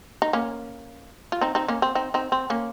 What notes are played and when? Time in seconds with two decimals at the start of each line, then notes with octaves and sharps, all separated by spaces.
0.22 D#4
0.33 A#3 C#4
1.32 F4
1.41 C4 D#4
1.55 C4 D#4
1.68 A#3 C#4
1.82 C4
1.95 C4 D#4
2.14 C4 D#4
2.32 C4
2.50 A#3 C#4